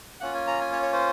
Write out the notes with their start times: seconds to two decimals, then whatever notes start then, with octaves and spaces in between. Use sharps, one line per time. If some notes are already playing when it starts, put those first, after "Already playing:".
0.20 A#3 C#4 F4 F#5
0.34 G#5
0.47 A#5
0.61 G#5
0.72 C#5
0.83 C#5
0.93 C5